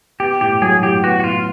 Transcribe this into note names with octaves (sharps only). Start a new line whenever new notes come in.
B3 G4
A2 G4
F#3 G#4
A2 G4
B3 F#4
F#4
A2 F4